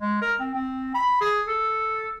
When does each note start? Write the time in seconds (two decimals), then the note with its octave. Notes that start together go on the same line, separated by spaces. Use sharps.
0.01 G#3
0.22 A#4
0.40 C4
0.54 C4
0.94 B5
1.21 G#4
1.47 A4